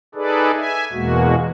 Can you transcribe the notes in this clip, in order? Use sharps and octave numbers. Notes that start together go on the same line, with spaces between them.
D#4 G#4 A4 B4 D5
E5 G#5
E2 B2 G#3 A#3 F#4